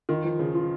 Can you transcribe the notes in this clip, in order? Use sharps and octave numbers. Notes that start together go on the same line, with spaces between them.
D#3 F4
F3
C#3 F3
F4